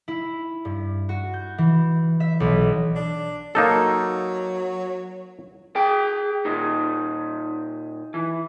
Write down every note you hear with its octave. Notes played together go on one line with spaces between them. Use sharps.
E4
G2
F#4
G6
E3
E5
B1
D4
F#3 A#3 D#4 A4
G#4 G5
A#2 D#4
E3